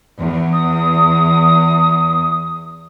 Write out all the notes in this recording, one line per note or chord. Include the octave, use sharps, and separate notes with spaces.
E2
D#6